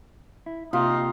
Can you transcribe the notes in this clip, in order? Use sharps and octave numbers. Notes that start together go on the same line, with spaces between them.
E4
C3 A#3 D#4 F4 G4